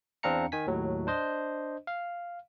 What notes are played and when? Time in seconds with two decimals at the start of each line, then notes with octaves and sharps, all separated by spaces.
0.23 E2 C4 D4 F5 A#5 C#7
0.52 D#3 G#5 B6
0.67 D#2 A2 F#3
1.07 D4 C5 D#5
1.87 F5